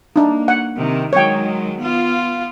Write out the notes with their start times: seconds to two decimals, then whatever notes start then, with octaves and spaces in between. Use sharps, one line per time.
0.16 A#3 D4 D#4
0.48 F#5
0.78 C3 D#3
1.13 D#3 F#3 G#3 C#5 G5
1.78 B3 F4